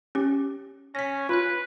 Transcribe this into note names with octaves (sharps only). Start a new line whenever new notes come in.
C#4 G4
C#4 A#6 B6
F4 B4 F#6